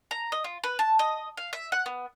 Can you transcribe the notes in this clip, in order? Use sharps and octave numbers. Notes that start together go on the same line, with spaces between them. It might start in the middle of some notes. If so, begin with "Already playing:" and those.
A#5
D#5
F4
B4
A5
D#5
F5
E5
F#5
B3